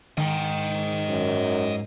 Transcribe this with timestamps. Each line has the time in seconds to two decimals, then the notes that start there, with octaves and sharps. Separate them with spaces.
0.18 G#2 D#3 D#5 G5
1.09 F#2